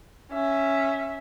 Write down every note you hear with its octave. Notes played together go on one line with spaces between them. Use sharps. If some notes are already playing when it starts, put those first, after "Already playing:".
C#4 E5